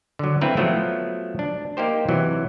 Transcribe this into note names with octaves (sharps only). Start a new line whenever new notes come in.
D3 F#3
A3 C4 E4 B4 F5 A#5
F3 F#3 A3 B3
D4
A#3 D#4 G4 C5
C3 E3 F#3